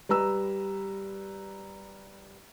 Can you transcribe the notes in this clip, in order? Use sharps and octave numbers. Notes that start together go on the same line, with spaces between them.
G3 B4 A#5 E6